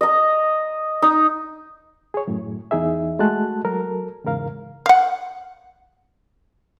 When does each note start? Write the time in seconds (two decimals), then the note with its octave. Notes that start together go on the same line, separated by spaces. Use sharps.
0.01 D#5 A#5
1.02 D#4
2.14 G#4 C#5
2.27 F#2 A2
2.71 E2 D#4 G#4 E5
3.19 G#3 A3 F#4 A5 F#6
3.65 F#3 A4 A#4
4.24 E2 G#2 C#3 A#4 F5
4.86 F5 F#5